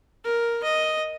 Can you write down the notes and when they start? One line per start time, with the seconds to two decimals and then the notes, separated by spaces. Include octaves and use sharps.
0.24 A#4
0.63 D#5